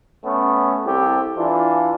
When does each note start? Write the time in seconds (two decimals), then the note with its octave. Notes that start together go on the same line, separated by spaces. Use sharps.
0.24 A3 B3 C#4
0.85 C2 C3 G4 A4
1.36 E3 D4 F4